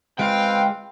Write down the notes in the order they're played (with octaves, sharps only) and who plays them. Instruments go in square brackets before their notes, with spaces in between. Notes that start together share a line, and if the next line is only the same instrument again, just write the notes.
[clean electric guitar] G#3 F4 [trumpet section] C4 B4 F5 [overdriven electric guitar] G5